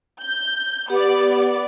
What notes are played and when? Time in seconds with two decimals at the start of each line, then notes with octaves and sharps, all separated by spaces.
0.21 G6
0.90 B3 G4 D5